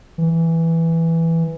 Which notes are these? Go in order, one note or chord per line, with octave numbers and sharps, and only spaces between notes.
E3